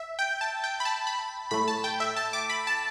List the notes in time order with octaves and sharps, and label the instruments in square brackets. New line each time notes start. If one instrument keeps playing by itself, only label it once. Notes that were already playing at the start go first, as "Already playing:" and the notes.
Already playing: [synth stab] E5
G5
A5
G5
B5
A5
B5
A2 A3 B5
A5
G5
E5
A5
D6
B5
A5